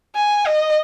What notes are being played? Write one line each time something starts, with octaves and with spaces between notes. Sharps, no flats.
G#5
D#5